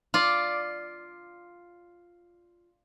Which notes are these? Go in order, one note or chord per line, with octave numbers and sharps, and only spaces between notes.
F4 D5